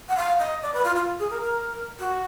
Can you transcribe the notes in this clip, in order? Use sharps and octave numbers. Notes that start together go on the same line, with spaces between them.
F#5
F5
D#5
D5
B4
F4
F4
G#4
A#4
A#4
F#4